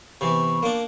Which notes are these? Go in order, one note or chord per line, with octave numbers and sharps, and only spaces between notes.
C3 E3 B3 B5 C#6
A#3 D4